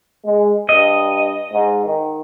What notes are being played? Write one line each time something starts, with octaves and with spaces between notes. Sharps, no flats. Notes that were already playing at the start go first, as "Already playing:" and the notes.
G#3
G2 D#5
G#2
D#3